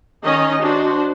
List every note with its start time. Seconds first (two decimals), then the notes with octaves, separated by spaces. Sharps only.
0.23 D#3 C#4 D#4 D#5
0.61 D4 F#4 C5